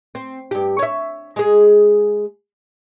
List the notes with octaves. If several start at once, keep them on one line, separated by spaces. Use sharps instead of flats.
C4
G2 G4
C#5 E5
G#3 G#4